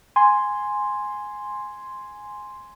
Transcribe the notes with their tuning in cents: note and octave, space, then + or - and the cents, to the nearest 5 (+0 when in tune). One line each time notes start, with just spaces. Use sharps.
G#5 +0 C6 +0